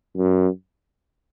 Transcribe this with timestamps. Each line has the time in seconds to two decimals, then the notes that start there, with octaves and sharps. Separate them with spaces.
0.17 F#2